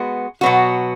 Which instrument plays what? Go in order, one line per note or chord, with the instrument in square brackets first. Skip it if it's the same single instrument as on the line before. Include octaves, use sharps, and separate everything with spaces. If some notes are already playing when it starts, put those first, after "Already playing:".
Already playing: [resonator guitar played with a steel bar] G#3 B3 F#4
B2 F#3 B3 F#4